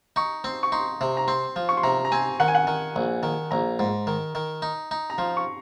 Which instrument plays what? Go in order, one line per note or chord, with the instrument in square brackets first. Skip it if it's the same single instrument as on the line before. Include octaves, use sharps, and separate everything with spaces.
[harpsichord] D#4 [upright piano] C#6
[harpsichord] C4 [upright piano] C6
[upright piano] C#6
[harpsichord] D#4 [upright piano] C6
[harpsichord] C3
[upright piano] A#5
[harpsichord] C4 [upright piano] C6
[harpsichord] F3
[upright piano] C#6
C6
[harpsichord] C3 [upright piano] A#5
[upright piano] A#5
[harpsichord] C4 [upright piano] G#5
[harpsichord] D#3 [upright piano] F#5
[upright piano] G#5
F#5
[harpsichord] D#3
A#1
D#3
[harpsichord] A#1 [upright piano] A#5
[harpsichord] G#2
D#3
D#3
D#4
D#4
[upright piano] A#5
[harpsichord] F3 [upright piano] C6
[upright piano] C#6